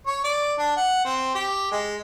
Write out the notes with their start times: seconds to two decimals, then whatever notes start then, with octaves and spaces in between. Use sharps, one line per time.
0.07 C#5
0.24 D5
0.59 D4
0.77 F#5
1.05 C4
1.35 G4
1.71 G#3